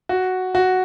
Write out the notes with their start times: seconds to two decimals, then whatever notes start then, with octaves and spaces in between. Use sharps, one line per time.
0.09 F#4
0.55 F#4